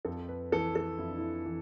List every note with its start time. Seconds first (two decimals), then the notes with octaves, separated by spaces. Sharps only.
0.05 F2 A4
0.29 B4
0.52 E3 A4
0.76 A4
0.99 F2 E4
1.08 D4
1.18 E4
1.46 E3